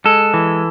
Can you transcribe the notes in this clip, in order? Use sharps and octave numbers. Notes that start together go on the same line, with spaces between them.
G#3 A4
E3